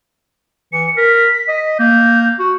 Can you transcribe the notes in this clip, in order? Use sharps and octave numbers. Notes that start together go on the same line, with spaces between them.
E3 C#7
A#4 B6
D#5
A#3 G6
F#4